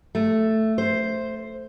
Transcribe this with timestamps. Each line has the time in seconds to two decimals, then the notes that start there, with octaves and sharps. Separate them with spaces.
0.15 A3
0.78 C5